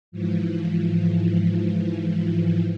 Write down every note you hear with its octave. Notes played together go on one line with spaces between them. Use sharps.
G#2 E3 F3